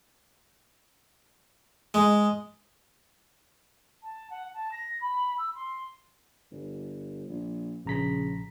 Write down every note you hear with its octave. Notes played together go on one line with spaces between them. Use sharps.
G#3
A5
F#5
A5
A#6
B5
E6
C6
G1
A#1
A#1 C#3 A#5 B6